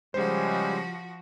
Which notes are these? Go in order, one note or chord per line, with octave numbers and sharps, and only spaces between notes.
C#3 F3 G3 G#3 F#4 C5